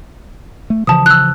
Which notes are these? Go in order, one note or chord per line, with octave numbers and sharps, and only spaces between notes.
A3
C#3 E3 F3 A5 D#6
E6 F#6